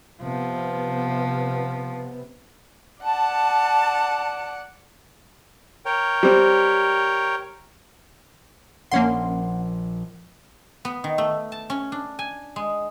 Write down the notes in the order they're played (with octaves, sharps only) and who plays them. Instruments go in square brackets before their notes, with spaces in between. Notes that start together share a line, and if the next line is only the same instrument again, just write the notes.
[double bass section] C3 B3 [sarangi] F3
[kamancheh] D5 F#5 [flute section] A5
[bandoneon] A#4 C#5 G5
[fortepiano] G3 C4
[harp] A#1 [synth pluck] A#3 C#4 C6 [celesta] F#5
[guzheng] B3
D#3
A3
A5
C#4
D4
G#5
G#3